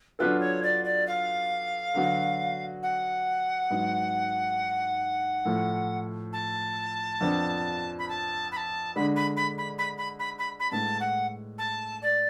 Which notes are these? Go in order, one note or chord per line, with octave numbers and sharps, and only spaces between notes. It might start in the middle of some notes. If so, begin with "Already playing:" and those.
F#3 B3 D4 F4 A4 B4
C#5
D5
D5
F5
D3 F#3 B3 F#4
F#5
G#2 F#3 B3
A2 F3 A3
A5
F2 F3 B3 D4
B5
A5
B5
A5
D3 G#3 D4 B5
B5
B5
B5
B5
B5
B5
B5
B5
A2 G#3 B3 A5
F#5
A5
D5